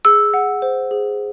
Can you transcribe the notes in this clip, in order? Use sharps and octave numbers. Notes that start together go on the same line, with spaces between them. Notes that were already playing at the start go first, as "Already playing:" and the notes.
G#4 E6
F#5
C5
G#4